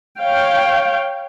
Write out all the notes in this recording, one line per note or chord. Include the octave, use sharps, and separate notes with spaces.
C#5 F5 G5